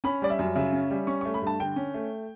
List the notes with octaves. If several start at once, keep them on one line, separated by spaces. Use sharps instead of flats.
C#4 B5
G3 D5
E5
F#2
C#3 E5
C#4
G3
C#4 C#6
A3 C#6
B5
G2 A5
D3 G5
C#4
A3